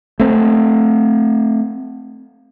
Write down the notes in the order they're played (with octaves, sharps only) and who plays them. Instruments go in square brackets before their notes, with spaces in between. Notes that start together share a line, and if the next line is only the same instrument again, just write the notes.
[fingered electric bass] A3 C4